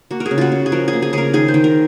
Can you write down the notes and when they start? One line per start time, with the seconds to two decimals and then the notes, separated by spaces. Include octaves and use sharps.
0.11 A#3 F#4
0.20 A#4
0.26 G#4
0.31 C#3
0.38 F4 F#4
0.52 C#3
0.66 G#4
0.72 F3 A#4
0.88 G#4
0.93 A#3
1.02 G#4
1.13 C#3 G#4 A#4
1.33 D#3 G#4
1.48 C5
1.54 D#3
1.64 A#4